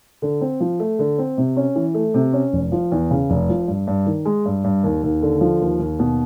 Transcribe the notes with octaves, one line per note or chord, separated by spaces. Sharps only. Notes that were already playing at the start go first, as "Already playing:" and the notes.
D3
C4
F3
A3
D3
C4
C3
C#4
E3
A3
C3
C#4
F1
F3
E2
C#3
F1
F3
G2
G2
D#3
G#3
G2
G2
D#2
D#2
D3
F3
D#2
D#2
B2